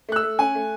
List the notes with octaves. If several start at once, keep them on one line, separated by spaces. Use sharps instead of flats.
A3 F#6
E6
A3
C#4 G#5
A3